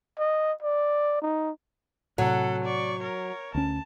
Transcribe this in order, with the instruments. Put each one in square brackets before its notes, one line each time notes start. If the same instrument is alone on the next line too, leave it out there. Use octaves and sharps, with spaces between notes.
[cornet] D#5
D5
D#4
[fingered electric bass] A2 C3 [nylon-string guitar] F#3 [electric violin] A4 F#5
[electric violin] D5 C#6
A#4 C#5
[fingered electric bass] D2 C#4 [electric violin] A5